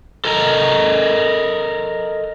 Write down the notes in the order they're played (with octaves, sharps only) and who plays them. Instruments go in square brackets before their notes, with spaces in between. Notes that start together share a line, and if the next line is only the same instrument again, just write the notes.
[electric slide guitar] A4 A#4 D#5 A5 A#5